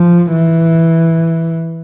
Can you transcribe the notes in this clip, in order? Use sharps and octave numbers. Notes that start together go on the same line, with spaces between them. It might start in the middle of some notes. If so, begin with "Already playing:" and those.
Already playing: F3
E3